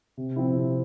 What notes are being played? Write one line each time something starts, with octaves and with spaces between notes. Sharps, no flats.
C3
F3 C4 E4
C3